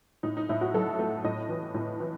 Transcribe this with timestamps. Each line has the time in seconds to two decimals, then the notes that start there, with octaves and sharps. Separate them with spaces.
0.23 A2 D#4
0.37 D#4
0.49 A2 E4
0.61 F#4
0.74 F#3 A4
0.99 A3
1.24 A2 D#5
1.49 E3
1.74 A2
2.00 E3